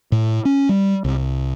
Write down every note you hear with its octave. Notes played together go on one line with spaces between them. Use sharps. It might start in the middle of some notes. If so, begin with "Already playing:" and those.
A2
C#4
G3
C2